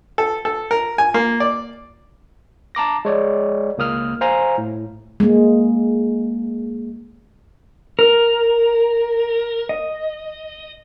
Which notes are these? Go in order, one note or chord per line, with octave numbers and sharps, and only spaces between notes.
A4
A4
A#4
G#5
A#3
D5
A5 A#5 D6 A#6
G#3 C#5 D5
C#2 A#3 D#6 F6
C5 F5 G#5 A#5
A2
G#3 A#3
A#4
D#5